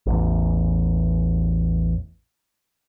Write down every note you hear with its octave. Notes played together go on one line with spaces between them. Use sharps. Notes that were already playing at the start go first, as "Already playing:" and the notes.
A1 E2